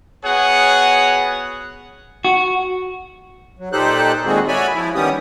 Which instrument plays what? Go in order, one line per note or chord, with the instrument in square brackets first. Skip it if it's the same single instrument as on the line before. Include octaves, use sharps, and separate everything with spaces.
[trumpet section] B3 F#4 G#4 C#5 F#5
[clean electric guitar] F#4
[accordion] F#3
A#2 D#4 G4 A4 C5 F#6
A#2 D#3 G#3 C4 F#4 G#4
F#4 C#5 D5 E5 G#5 B5
F3 E4
D#3 G3 B3 C#4 G4 D#6